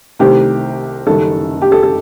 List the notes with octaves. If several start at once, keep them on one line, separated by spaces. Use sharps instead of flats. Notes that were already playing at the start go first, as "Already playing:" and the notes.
C2 C3 D#3 A3 C4 G4
F#1 F#2 D#3 G3 A4
G4
A4
A4